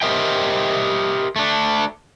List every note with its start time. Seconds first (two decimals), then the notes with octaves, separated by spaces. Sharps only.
0.01 G4 A#4 C5 D#5 E5 G5
1.36 A3 D4